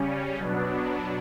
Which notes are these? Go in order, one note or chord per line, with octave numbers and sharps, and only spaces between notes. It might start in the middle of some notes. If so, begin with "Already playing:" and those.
Already playing: C#3 G3 C#4
B2 F#3 B3 D4